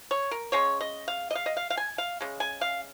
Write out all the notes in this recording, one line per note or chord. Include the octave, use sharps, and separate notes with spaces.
C#5
A#4
C#3 G#3 C#4 C#5
D#5
F5
D#5
F5
D#5
F5
F5
G#5
F5
C#3 G#3
G#5
F5